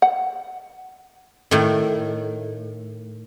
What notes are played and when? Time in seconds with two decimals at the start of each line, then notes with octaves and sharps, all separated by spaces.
0.02 F#5
1.51 A2 D#3